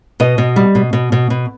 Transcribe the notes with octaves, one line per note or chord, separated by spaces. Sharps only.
B2 D#5
B2
G3
B2
B2
B2
B2